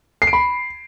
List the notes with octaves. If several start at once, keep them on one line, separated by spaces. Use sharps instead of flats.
C7
D7
B5